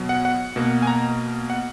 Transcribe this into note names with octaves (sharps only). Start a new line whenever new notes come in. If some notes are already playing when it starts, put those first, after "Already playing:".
Already playing: B2 F#3 B3
F#5
F#5
B2 A#3
G#5
A#5
F#5